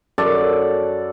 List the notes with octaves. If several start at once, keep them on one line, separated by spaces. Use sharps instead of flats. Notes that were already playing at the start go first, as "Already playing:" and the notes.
F#2 A4 D5